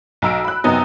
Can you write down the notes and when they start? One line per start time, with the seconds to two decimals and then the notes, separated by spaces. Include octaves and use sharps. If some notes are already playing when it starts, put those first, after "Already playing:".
0.22 B1 A#5 E6 D7
0.45 B5 F#6
0.64 F#2 C3 B3 D#4